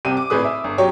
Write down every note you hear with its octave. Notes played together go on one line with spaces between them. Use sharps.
C2 C3 G4 D#7
D6
G#1 A2 G#4 B4 D#6
E5
G1
F#3 C#4 G4 C#5